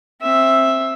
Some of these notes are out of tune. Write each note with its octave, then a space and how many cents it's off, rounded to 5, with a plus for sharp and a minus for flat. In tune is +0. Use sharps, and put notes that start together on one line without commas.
C4 +20 E5 +0